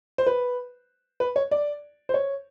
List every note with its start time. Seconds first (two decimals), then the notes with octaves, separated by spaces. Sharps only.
0.18 C5
0.27 B4
1.20 B4
1.36 C#5
1.51 D5
2.09 C5
2.14 C#5